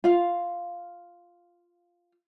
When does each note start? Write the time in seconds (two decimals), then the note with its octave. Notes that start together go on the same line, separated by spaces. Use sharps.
0.04 F4 F5